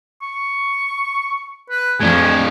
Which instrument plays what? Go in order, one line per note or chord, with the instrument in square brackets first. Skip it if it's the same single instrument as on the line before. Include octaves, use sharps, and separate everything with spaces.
[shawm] C#6
B4
[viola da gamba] F2 [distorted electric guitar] A2 D4 [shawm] G#5